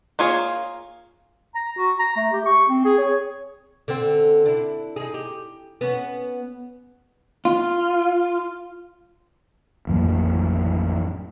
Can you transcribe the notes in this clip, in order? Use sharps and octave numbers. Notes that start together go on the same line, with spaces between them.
A#3 F4 G#4 C#5
A#5
F#4
A#5
A3
G4
C#6
C4
G#4
C#5
D3 C4
D4 E4
D#4 G#4
G4
B3 C#4
F4
A1 F2 F#3 A#3